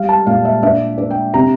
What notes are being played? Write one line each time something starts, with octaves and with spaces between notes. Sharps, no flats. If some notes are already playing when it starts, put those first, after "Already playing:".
Already playing: G3 F5
A5
A#2 F5
E5
D4 E5
D4
G5
C3 A#5